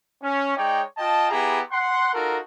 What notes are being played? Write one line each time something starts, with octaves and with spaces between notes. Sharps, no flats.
C#4
G#3 D#4 C#5 D5 G5
F4 D#5 G5 A5
B3 E4 G4 G#4 A#5
F#5 C6
D#4 F4 F#4 A4 A#4